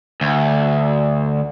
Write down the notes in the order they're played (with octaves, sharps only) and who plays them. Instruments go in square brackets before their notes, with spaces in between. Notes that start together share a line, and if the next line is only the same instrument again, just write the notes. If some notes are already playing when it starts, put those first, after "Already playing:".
[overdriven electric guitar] D2